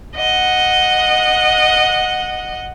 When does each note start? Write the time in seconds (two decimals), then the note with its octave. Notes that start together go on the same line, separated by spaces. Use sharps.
0.17 D#5 F#5